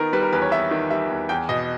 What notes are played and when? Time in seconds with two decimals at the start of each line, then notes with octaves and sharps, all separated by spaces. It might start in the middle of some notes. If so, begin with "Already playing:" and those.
Already playing: D#3 B3 A#4
0.13 G3 B4
0.23 A#4
0.32 E2 B4
0.42 C#5
0.52 B3 E5
0.71 D#3
0.90 G3 E5
1.10 E2
1.29 E2 G5
1.49 B2 D#5